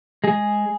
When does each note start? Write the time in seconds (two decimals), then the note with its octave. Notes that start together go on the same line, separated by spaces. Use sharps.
0.24 G#3 G#4